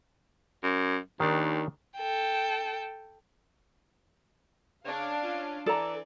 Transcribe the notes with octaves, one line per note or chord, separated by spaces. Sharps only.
F#2
D#2 D#3 D4
A4 G5
C#3 D4 C#5 F5
C#4 F4
E3 A4 D5 A#5